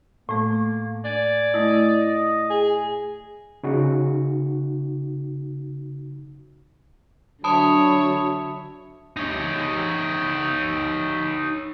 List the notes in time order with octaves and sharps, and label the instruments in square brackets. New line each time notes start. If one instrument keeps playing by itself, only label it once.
[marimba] A2 A3 [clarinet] A#3
[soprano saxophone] D5 [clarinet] G#5
[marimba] A3 E4 [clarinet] D#5
[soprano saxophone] G#4
[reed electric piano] C#3 D#4 F#4
[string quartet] D3 F#3 [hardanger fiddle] C#5 E5 [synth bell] A5 B5 D#6
[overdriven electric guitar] D#4 C#5